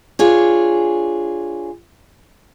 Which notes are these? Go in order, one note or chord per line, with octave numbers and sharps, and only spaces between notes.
D4 F4 G#4 C#5